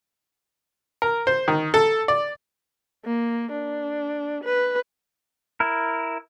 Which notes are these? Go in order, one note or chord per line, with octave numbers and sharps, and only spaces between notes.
A#4
C5
D#3
A4
D5
A#3
D4
B4
E4 A#4